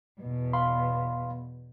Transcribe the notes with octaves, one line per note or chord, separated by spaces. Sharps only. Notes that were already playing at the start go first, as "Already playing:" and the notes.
E2 B2
F5 B5 C6